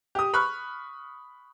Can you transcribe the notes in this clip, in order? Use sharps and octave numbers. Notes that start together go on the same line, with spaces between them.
G4 D#6
B5 C#6 F6 F#6